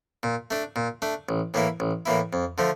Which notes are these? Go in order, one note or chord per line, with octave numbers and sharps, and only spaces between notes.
A#2
A3 D4
A#2
A3 D4
A1
A2 E3 A#3 E4
A1
A2 E3 A#3 E4
F2
D3 F3 A3